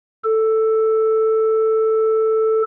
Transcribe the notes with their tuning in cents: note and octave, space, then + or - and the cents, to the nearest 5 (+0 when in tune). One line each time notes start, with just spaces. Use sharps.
A4 +5